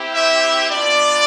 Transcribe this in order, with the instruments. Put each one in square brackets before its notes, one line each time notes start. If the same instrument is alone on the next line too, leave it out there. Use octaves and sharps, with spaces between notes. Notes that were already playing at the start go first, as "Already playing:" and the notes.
Already playing: [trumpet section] C4 E4 G4
E5
B3 D4 F4 D5